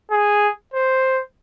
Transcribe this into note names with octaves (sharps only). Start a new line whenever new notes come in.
G#4
C5